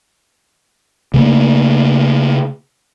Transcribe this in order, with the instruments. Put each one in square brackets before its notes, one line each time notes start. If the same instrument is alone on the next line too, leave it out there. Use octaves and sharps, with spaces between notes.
[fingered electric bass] C#3 A3 A#3